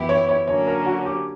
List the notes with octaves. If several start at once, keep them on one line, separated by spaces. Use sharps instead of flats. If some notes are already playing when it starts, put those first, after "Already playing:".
Already playing: F#2 E3 B3 E4 G4
C#5
C#5
D3 F#3 A#3 C#4 C#5
A#4
F#4
G4